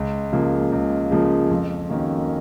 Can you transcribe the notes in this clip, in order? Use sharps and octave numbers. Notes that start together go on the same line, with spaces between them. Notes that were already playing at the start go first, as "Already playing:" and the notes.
Already playing: C#2
C#3 F3 A#3
C#2
C#3 F3 A#3
F2
D#3 A#3 C#4 F#4